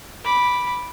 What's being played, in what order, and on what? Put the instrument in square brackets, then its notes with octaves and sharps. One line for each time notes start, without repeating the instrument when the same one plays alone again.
[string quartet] B5 D6